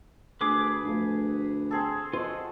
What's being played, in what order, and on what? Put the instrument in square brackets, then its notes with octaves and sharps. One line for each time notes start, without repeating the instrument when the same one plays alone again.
[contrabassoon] D2 [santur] G#4 [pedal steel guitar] B4 D6
[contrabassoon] D2 [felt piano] F3 A3
[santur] C4 G#4 A4 [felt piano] E6
[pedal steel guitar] F4 F#4 [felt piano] C5 D#5